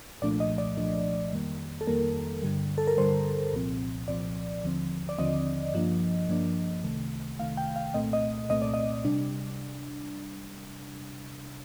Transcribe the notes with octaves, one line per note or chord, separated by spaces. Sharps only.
C2 A#2 F3 A3 D4 D5
D#5
D5
C2 A#2 F3 A3 D4
F2 D#3 G3 A#3
A4
F2 D#3 G3 A#3 A#4
G2 D3 G3
A4
A#4
G2 D3 G3 C5
C2 A#2 F3 C4
C2 A#2 F3 C4 D5
D#2 D3 F3 C4
D5
D#2 D3 F3 C4 D#5
G2 F3 A#3 D4
G2 F3 A#3 D4
C2 C3 D#3 A3
C2 C3 D#3 A3 F5
G5
F5
C2 A#2 A3 C4 D#5
D#5
C2 A#2 A3 C4 D#5
D5
D#5
C3 G3 D4